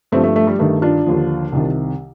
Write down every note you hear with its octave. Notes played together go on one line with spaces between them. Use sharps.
G2 F3 A3 C4
A3
A3
G3
G2 D#3 A3
D4 F4
D#2 D3 F3
C2 C3 D#3